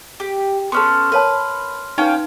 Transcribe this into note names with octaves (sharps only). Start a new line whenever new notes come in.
G4
B3 C#4 A4 C6 F6
A#4 B4 C#5 A5
C#4 D#4 B4 F5 G5